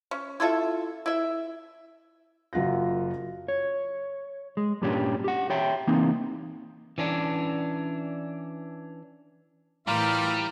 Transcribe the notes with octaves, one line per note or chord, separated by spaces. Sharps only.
C#4
E4 F4 A4 E5
E4 E5
F#1 F#2 F4 F#5 A#6
C#5
G#3
G2 A#2 G3 C#4 D4 G4
G4 F#5
G4 C#5 E5 G5
E3 A#3 C4 D#4
E3 C#4 D4
A2 E3 G3 F4 G4 A#4 D5 F5